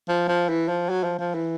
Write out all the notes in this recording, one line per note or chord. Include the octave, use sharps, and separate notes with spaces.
F3
F3
E3
F3
F#3
F3
F3
E3